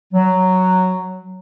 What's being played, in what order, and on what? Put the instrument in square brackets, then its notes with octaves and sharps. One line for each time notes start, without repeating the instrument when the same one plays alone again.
[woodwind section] F#3